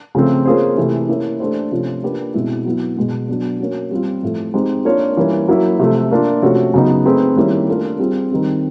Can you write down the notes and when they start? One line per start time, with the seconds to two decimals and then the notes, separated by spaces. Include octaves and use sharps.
0.15 C#3 F3 A3 C4
0.45 A#3 C#4 F4 G#4 C5
0.77 C3 E3 A3
1.09 A#3 C#4 E4
1.40 A3 D4 G4 C5
1.71 C3 F3 A3 C#4 F4
2.03 A#3 D4 G4 B4
2.34 B2 G#3 C4 E4
2.65 F#3 B3 E4
2.97 B2 G#3 B3
3.28 F#3 B3 D4
3.60 A#3 C#4 F#4
3.91 G3 C4 F4
4.23 A2 F3 A3
4.54 G#3 C4 D#4 G4 C5
4.85 A#3 D4 F4 A#4 C#5
5.17 E3 G3 A#3 C#4 F4
5.48 F#3 A#3 C#4 E4
5.79 C3 F3 A3
6.11 A#3 D4 F4
6.42 C3 F3 A3 C#4 F#4
6.74 C#3 F#3 B3 D#4
7.05 A3 C4 D#4 G#4 B4
7.36 D#3 G3 A#3 C#4 E4
7.68 A3 D4 F4 A#4
7.99 G3 C4 F4 G#4
8.31 D#3 G3 C4